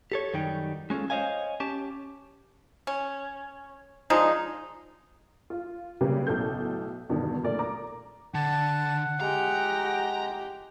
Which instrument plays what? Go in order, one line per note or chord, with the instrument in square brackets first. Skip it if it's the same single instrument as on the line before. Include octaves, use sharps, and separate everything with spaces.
[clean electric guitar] G4 A4 C#5
F#2 D#3 G3 D#4 G5
G#3 C#4 D#4 F4 A4
C5 C#5 D#5 F5 G#5
C#4 G4 A5
[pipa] C#4
F3 G#3 D4 D#4
[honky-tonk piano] F4
C#3 F#3 G3 A#3 G4 B4
B1 A2 F#3 A4 G6
E2 G2 B2 D3 D#3
F#2 A#2 A3 A#4 D5
A#5 D6
[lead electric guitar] D3 [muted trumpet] F#5 [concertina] A5
[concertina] G#3 [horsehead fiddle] G4 [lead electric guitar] A#5